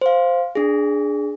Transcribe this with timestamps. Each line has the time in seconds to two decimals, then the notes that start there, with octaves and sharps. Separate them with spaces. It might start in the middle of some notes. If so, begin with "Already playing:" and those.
0.01 C5 F5
0.55 D4 G#4